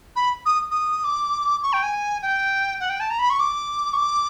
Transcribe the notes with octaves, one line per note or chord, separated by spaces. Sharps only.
B5
D#6
D#6
D6
C#6
G5
G#5
G5
F#5
G5
A5
A#5
B5
C#6
D6
C#6
D6